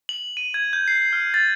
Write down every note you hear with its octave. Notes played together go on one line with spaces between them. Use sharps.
F#7
D#7
G#6
G6
C7
F6
A6